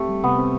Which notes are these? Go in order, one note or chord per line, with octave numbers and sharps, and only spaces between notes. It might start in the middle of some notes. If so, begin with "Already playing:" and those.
Already playing: A3 C4 G4
G3
C3 B3
C4